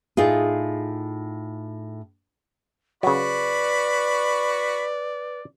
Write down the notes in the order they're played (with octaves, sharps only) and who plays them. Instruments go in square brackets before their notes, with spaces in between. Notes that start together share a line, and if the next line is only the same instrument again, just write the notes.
[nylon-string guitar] A2 D#4 F4 G#4
[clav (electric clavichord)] C#3 F#3 [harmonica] F#4 B5 [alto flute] B4 [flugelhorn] D5